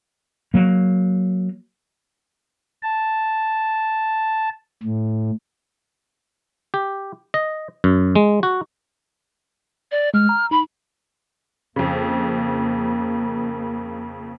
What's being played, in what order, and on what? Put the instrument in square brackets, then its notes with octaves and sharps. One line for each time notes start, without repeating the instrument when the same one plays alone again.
[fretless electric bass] F#3 A#3
[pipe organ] A5
A2
[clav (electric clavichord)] G4
D#5
F#2
G#3
F#4
[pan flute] D5
[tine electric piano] G#3 [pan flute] F6
[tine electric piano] A#5
[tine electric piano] D#4 [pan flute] B5
[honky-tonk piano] F2 C#3 [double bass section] A#3